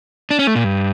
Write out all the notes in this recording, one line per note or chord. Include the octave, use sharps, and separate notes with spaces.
D4
C#4
A3
A#2
G2